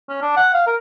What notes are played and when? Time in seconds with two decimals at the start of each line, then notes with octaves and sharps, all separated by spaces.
0.09 C#4
0.22 D4
0.36 F#5
0.54 F5
0.67 A#4